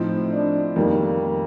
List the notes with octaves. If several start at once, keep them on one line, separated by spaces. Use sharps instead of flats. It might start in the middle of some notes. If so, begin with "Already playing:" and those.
Already playing: A2 F3 C4 D#4
D4
F2 D#3 G3 A#3